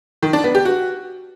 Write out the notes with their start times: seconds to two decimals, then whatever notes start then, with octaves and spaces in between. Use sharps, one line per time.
0.23 D#3
0.33 D4
0.44 B3
0.55 G4
0.65 F#4